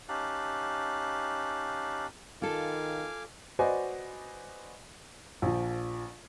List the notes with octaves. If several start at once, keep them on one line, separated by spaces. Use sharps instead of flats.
C#4 D#4 G4 F5 A5 F#6
D#3 F4 A4 F5 G#5 D6
F#4 B4 C5 D5 D#5 G#5
A#1 F3